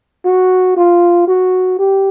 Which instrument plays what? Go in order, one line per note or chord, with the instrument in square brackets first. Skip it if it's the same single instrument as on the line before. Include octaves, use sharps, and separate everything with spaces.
[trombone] F#4
F4
F#4
G4